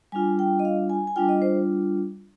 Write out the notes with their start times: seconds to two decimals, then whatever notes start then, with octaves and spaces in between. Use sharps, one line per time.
0.12 G3 D4 F4 G#5
0.39 G5
0.60 D#5
0.65 F5
0.90 G#5
1.07 G#5
1.16 G3 D4 F4 G5
1.29 D#5
1.42 C5